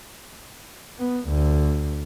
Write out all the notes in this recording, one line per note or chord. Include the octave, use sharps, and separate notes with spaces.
B3
D2